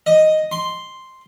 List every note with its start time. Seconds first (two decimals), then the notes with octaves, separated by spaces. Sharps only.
0.06 D#5
0.52 C6